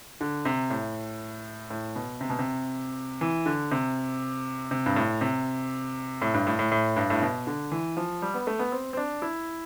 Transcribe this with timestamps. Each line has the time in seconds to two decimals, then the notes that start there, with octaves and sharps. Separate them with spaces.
0.21 D3
0.45 C3
0.70 A2
1.70 A2
1.96 B2
2.21 C3
2.30 B2
2.39 C3
3.21 E3
3.46 D3
3.71 C3
4.71 C3
4.86 G2
4.96 A2
5.21 C3
6.22 A2
6.34 G2
6.47 A2
6.59 A2
6.72 A2
6.97 G2
7.10 A2
7.22 B2
7.47 D3
7.72 E3
7.97 F3
8.22 G3
8.34 B3
8.47 A3
8.59 B3
8.72 C4
8.93 C4
8.97 D4
9.22 E4